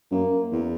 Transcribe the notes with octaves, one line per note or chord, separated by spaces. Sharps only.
F#2 A#3
E2